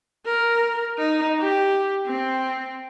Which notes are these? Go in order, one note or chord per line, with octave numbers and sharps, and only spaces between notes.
A#4
D#4
G4
C4